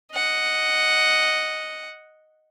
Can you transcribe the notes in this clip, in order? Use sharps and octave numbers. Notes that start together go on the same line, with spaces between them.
D#5 F#5